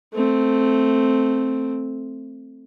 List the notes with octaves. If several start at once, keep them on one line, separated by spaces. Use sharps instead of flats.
A3 C4